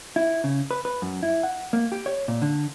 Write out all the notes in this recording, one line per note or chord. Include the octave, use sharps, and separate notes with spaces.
E4
C#3
B4
B4
F#2
E4
F#5
A#3
G4
C#5
A#2
D3